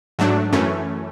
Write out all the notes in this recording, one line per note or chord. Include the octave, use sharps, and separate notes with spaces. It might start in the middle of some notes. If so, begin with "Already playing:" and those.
G#2 F#3 A3 D4
F#2 E3 A3 C#4